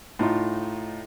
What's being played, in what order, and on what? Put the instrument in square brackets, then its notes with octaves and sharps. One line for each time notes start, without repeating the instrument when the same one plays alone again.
[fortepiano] A2 D#4 F4